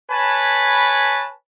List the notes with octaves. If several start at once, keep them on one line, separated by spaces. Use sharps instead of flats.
B4 C#5 G#5 A5 B5